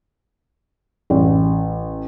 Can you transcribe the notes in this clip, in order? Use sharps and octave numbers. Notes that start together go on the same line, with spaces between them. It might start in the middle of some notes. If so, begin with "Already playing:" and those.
A1